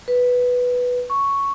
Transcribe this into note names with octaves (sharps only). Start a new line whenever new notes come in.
B4
C#6